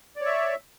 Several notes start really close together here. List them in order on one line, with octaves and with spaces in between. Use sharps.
D5 C#5 E5